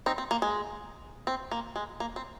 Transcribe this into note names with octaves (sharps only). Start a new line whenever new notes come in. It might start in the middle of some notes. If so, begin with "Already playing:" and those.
C4 D#4
C4
A#3
G#3
C4
A#3
G#3
A#3
C4